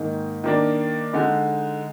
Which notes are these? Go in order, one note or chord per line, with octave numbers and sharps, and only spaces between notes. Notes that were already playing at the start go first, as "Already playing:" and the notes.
Already playing: G#2 D#3 A#3 D#4
D#3 A#3 D4
D3 G#3 D#4